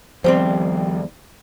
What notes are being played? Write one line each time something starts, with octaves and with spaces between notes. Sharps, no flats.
D#2 F3 G3 B3 C4 C5